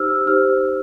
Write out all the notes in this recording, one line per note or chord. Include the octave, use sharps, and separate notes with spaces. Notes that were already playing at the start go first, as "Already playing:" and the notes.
Already playing: D#4 G4 C5 E6 F6
D#4 G4 C5 F6